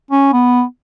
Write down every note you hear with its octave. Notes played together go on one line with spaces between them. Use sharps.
C#4
B3